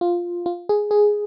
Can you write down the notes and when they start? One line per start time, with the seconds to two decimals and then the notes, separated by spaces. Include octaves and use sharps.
0.01 F4
0.46 F4
0.69 G#4
0.91 G#4